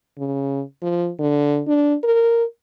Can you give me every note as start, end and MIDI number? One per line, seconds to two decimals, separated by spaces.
0.19 0.62 49
0.82 1.11 53
1.19 1.62 50
1.67 1.95 62
2.04 2.44 70